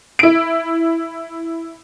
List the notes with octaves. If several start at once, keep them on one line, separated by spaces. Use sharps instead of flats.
E4 D7